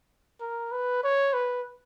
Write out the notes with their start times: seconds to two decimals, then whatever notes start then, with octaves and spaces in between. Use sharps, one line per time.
0.41 A#4
0.72 B4
1.04 C#5
1.33 B4